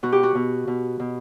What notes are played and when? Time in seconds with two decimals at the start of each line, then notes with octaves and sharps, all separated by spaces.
0.03 B2 F#4
0.12 G4
0.23 F#4
0.35 B2
0.67 B2
1.00 B2